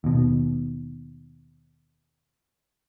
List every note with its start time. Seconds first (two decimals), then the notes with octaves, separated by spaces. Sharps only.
0.04 D#2 B2